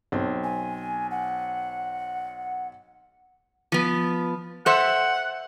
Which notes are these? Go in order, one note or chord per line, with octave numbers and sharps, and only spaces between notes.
B1 C4
G#5
F#5
F3 B3
A4 C5 E5 F#5